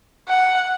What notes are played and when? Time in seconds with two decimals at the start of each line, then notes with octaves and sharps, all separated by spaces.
0.28 F#5